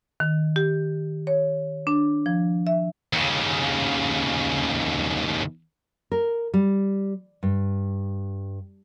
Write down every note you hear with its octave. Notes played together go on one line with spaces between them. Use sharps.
D#3
G4
C#5
D4
F3
E5
D#2 C#3
A#4
G3
G2